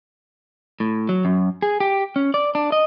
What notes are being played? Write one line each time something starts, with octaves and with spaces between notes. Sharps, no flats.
A2
F#3
F#2
G#4
G4
C#4
D5
D4
D#5